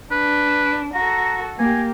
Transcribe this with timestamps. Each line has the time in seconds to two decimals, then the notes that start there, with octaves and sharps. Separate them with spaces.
0.12 D4 B4
0.94 F#4 A4 A#5
1.59 A#3 G4 G#5